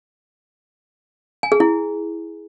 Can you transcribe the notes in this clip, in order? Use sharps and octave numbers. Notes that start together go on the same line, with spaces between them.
G#5
G#4
E4